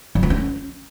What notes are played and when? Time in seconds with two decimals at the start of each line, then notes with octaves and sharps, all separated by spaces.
0.15 F3
0.23 F4
0.30 C#4